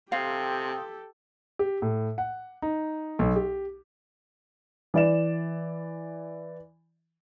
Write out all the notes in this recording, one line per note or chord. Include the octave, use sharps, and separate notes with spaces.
C3 G4 A4 F5 G5 C6 D#6
G4
A2
F#5
D#4
B1
G4
E3 D5 E7